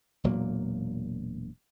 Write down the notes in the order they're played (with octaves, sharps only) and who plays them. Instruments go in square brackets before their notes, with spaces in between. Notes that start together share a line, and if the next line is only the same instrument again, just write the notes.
[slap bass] E1 A#2 F#3 A#3